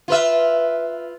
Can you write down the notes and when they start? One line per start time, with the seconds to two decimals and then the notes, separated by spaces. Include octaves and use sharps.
0.08 F4 B4 E5